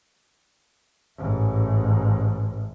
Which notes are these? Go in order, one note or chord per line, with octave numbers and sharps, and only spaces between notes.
A1 G#2